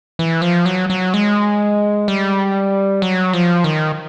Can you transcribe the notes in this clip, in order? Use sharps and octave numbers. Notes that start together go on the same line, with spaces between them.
E3
F3
F#3
F#3
G#3
G3
F#3
F3
D#3